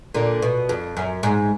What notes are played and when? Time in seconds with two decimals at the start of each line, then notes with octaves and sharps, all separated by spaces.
0.14 A#2 D3
0.42 B2
0.69 F2
0.97 F#2
1.23 G#2